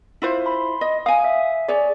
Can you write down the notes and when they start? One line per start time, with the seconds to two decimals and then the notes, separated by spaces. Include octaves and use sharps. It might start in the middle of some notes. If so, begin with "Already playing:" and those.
0.22 E4 F4 C5
0.46 B5 C6
0.81 D#5
1.06 F5 G#5 D#6
1.24 E5
1.68 G#4 C#5 D5